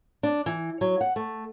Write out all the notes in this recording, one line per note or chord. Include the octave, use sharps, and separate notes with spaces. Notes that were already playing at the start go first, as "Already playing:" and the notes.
D4
E3
F#3
F#5
A3